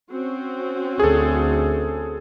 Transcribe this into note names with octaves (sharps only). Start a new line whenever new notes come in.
C4 C#4 F#4
D2 G#4 A4